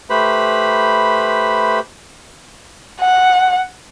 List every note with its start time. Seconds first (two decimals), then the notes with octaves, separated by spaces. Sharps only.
0.10 A3 G4 B4 C5 B5
3.01 F#5